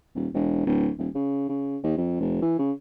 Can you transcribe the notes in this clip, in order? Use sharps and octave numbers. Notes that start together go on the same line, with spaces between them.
D#1
E1
D1
D#1
C#3
C#3
D#2
F2
F1
E3
C#3